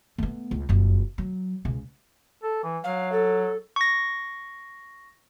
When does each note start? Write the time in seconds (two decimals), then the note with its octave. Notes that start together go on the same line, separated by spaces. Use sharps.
0.18 A3 B3
0.51 C#2
0.69 F#1 F2
1.18 F#3
1.65 C#2 C#3
2.43 A4
2.63 E3
2.84 F#3 F5
3.12 A4
3.76 C#6 A#6